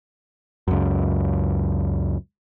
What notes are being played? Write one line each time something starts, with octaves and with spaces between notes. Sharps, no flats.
C#2 F#2